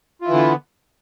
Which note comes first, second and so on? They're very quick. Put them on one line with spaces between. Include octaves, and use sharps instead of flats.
F4 E4 E3 D3 B3